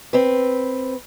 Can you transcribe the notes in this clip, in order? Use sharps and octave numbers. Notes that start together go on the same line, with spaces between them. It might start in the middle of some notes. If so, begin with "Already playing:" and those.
C4 B4